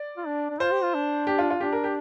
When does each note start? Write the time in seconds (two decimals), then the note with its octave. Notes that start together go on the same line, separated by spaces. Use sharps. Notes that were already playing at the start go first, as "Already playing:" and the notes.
Already playing: D5
0.17 F4
0.26 D4
0.50 D4
0.60 F4 C5
0.71 G4
0.82 F4
0.94 D4
1.27 G4
1.39 F4
1.50 F4
1.60 D4 G4
1.73 A#4
1.84 G4